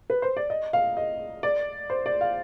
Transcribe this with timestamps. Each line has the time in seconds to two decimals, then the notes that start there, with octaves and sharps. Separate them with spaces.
0.10 B4
0.22 C5
0.37 D5
0.50 D#5
0.73 F5
0.97 D#5
1.43 D5
1.90 C5
2.06 D5
2.21 F5